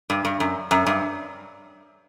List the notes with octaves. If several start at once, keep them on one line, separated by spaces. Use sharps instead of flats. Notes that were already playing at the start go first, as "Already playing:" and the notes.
G2
G2
F#2
F#2
G2